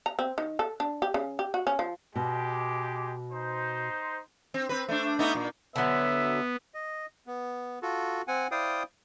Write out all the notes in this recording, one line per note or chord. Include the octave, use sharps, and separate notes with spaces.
A#5
C4
D#3
A4
D4
G4
C#3
G4
F#4
C#4
F3
B2 G#3 G4
D#4 C5
C4
C4 B4
A3 D4
A3 B3 D#4
A#2
D3 F#3 B3 E5
D#5
B3
F4 F#4 A4
C4 F#5 G#5
E4 C5 D5 F5 G5 D#6